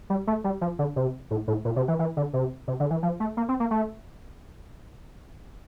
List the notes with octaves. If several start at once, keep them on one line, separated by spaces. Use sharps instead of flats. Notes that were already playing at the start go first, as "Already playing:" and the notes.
G3
A3
G3
F3
D3
C3
A2
A2
A#2
C3
E3
E3
D3
C3
C3
D3
E3
F3
A3
A#3
C4
A#3
A3